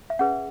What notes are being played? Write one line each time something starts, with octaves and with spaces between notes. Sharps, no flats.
E5
C#4 G#4 B4 F#5